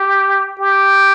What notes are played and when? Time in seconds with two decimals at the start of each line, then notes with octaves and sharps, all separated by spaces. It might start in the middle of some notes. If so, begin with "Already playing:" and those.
Already playing: G4
0.59 G4